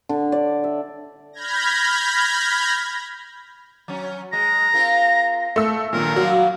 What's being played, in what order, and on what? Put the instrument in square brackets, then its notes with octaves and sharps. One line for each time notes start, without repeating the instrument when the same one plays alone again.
[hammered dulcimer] D3
D5
E5
[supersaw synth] B5 F6 G6 G#6 A#6
[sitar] F#3 C#4
[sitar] G#3 [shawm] A#5
[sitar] C4 F4 A#4
[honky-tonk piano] A3 E6
[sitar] G2 D#3 F#3 [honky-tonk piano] A#2 [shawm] A#4
[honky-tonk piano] F#3 [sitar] G3 C#4 F4